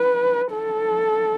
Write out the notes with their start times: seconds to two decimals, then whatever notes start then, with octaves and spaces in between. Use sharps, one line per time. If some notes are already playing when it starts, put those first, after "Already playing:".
Already playing: B4
0.54 A4